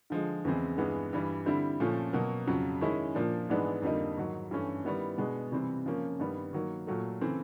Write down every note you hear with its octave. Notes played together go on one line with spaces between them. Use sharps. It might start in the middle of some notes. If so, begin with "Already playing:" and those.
D3 F3 G#3
E2 C#3 E3 G#3 C4
G2 E3 G#3 B3
G2 E3 G3
D3 G3 C4 E4
A#2 F3 A3 C#4
B2 F#3 A#3
F2 C#3 F#3
D#3 G#3 C#4 E4
A#2 F3 A#3 D4
G#2 E3 G#3 B3 D4
F2 D3 G3 A#3 D#4
G#2 D#3 F#3
G2 E3 A3 C#4
D#3 G3 B3 E4
B2 G#3 B3 D4
C3 E3 G3 C4
C#3 F3 A#3 C#4
G2 D#3 G3 B3
D#3 F#3 A#3
A#2 F#3 A3
C#3 E3 A3 C4